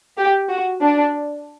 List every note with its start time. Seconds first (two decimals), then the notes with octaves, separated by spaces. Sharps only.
0.18 G4
0.49 F#4
0.81 D4